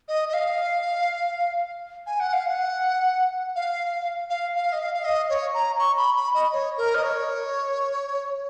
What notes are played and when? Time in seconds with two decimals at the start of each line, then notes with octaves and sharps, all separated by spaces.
0.08 D#5
0.28 D#5
0.33 F5
2.06 G#5
2.20 F#5
2.33 F5
2.46 F#5
3.55 F5
4.30 F5
4.55 F5
4.72 D#5
4.79 F5
4.94 F5
5.04 D#5
5.29 C#5
5.54 A#5
5.79 C#6
5.97 B5
6.16 B5
6.34 D#5
6.53 C#5
6.77 A#4
6.95 D#5
7.03 C#5